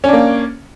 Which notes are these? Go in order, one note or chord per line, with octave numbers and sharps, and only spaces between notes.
A#3 C#4 D4